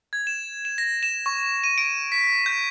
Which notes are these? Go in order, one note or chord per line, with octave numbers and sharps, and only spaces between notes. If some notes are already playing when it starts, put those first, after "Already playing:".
G#6
E7
E7
A#6
E7
C#6
D#7
D7
B6
G6